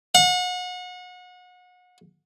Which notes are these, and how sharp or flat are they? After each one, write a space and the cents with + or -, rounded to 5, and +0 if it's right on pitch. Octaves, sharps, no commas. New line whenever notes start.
F#5 -35